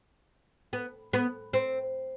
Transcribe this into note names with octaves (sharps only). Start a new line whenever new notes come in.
B3
B3
C4